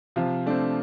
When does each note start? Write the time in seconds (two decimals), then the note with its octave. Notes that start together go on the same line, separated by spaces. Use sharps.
0.16 C3 F3 F4
0.46 A3 C4 D4